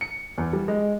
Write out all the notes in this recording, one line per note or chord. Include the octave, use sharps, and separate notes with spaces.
C#7
E2
G3
G#3